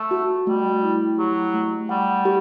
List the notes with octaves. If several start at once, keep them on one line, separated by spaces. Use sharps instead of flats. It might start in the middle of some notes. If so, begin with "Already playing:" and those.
Already playing: A3
F#4
G3 A3
E4
F#3 G4
A3
G3 F#5
G4